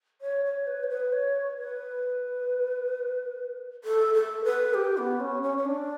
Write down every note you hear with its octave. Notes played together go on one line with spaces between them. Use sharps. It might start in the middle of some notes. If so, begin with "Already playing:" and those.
C#5
C#5
B4
C#5
B4
C#5
B4
A4
A4
B4
G4
B3
C#4
C#4
C#4
D4